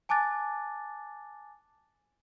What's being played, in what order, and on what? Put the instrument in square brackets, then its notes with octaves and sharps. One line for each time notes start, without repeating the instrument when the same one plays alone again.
[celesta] G#5 A5 D6 F#6 A6